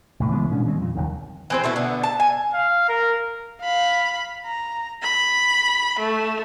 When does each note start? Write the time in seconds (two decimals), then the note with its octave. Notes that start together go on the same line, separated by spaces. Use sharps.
0.20 C2 A2
0.32 C#3 E3 G#3 B3
0.51 A#2 G#3 C#4 D4
0.66 D#3 G3 G#3 C4
0.77 F2 A#2
0.95 F#1 D#2 D#3
1.50 E3 C4 C5
1.64 B2 A3 E4
1.76 D3 B3
2.03 A5
2.20 G#5
2.54 F5
2.89 A#4
3.61 F5 B5
4.46 A#5
5.03 B5
5.99 A3